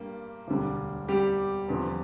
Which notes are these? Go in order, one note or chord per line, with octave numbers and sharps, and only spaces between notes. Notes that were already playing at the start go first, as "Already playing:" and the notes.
Already playing: G2 G3 A#3
E1 D2 D3 G3
G3 G4
E2 D3 F3 C4